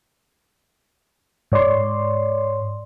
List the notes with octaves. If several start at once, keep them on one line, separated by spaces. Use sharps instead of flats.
G#2 C#5 D5 C6